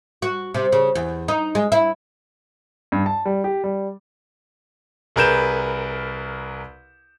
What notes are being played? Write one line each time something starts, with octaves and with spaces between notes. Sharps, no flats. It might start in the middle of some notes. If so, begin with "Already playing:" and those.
F#4
C3
C#3
E2
D#4
G#3
E4
G2
A5
G3
G4
G3
C2 G#4 A#4 B4 G6 E7